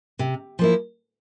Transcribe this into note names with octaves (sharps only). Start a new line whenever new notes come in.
C3
F3 A#3 E4